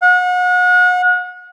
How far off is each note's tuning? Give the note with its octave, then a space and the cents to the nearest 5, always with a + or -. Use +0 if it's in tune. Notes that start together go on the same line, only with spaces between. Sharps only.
F#5 -35